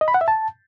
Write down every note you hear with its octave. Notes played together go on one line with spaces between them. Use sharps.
D#5
B5
F#5
E5
A5